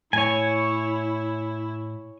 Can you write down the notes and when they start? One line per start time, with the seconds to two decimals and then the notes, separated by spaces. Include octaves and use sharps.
0.13 A2 E4 C#5 G#5